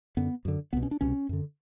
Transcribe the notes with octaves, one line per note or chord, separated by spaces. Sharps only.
F#2 D3 B3
F#2 D3
C2 B2 B3
C#4
D4
C2 B2 C#4
F#2 D3